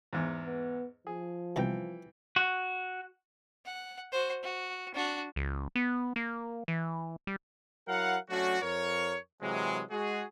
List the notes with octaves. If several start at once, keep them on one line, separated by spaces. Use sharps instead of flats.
E2 G#2
B3
F3 G#4
C2 B2 E3 G5 A#5
F#4
F#5
F#4 C5
F#4
D4 F#4
C#2
B3
A#3
E3
G3
F#3 E4 A#4 F5 F#5
F#3 A3 C#4 D4 F#4
F2 A#4 C#5
C3 E3 F#3 G#3
G#3 F#4 G#4